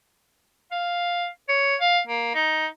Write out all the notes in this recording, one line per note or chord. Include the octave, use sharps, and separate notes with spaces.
F5
C#5
F5
A#3
D#4